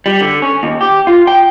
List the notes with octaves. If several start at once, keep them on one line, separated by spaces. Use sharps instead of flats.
G3
D3
C#4
D#2
G4
F4
G5